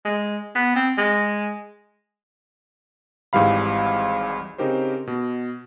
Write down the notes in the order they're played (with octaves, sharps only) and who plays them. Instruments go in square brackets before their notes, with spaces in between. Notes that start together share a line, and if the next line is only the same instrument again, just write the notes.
[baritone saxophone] G#3
B3
C4
G#3
[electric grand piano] G#1 G#2 E3 G3 F5 B5
C#3 C4 D#4 G4 A#4 C5
B2